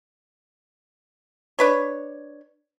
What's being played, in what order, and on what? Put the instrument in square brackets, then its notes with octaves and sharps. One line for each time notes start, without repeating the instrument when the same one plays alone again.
[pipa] D4 B4 C#5